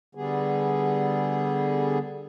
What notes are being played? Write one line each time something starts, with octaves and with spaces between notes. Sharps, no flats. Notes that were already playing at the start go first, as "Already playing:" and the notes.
D3 G3 B3 G#4